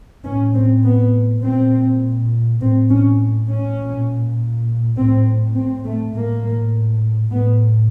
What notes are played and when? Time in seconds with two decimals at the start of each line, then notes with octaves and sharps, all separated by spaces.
0.24 A2 C#4
0.54 C4
0.83 B3
1.42 A#2 C4
2.59 A2 C4
2.90 C#4
3.48 C#4
3.78 A#2
4.95 A2 C4
5.54 C4
5.84 A3
6.13 A2 A#3
7.31 A2 B3